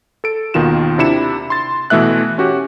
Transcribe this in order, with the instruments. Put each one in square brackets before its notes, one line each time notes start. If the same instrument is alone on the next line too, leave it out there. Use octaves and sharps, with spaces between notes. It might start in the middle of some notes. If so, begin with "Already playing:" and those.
[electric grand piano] A4 D7
D#2 B2 D#3 F4 E7
C3 D4 E4 C#7 E7
C6 A6
B2 E3 A3 E5 F#6
C#4 F#4 G4